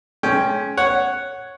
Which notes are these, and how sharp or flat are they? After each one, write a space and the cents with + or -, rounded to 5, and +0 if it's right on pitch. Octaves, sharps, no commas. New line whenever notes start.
G#3 +35 C#4 +5 G5 +0
C#5 +0 F#5 +0